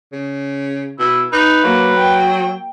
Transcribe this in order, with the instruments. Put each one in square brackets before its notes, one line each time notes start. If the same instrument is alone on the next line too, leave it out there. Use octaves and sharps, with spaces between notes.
[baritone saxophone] C#3
[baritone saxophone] B2 [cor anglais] E4
[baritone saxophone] D#4 [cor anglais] B4
[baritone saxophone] F#3 [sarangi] A#3
[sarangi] G5